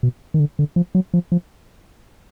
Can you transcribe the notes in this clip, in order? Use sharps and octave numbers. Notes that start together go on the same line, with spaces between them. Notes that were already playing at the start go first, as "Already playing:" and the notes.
B2
D#3
D3
D3
F3
F#3
F3
F3